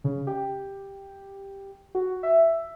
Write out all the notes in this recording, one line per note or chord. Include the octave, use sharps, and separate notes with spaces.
C#3
G4
F#4
E5